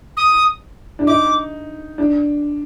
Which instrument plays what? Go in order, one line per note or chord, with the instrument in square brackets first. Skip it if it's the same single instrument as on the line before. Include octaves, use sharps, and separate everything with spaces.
[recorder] D#6
[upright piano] D4
[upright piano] D#4 [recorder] D6
[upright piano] D4